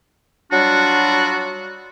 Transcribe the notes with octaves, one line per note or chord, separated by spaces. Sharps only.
F#3 G3 D4 F4 F#4